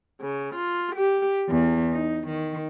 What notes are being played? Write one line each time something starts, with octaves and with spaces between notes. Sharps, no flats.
C#3
F4
G4
E2
D#4
D#3